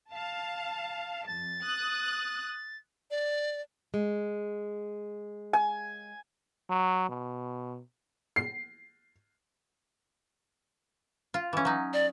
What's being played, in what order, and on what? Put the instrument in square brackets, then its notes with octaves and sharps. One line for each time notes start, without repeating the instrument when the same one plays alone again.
[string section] F5 A5
[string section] F2 [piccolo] A6
[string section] D#6 F#6
[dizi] D5
[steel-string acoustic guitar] G#3
[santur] G#5
[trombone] F#3
B2
[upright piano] C7
[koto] F4
E3 C#4
F#3 D#4
[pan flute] D5